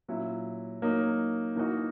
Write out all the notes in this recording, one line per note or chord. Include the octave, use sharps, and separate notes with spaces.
A#2 F#3 C#4 E4
F#3 A#3 D#4
E3 A#3 D#4 F#4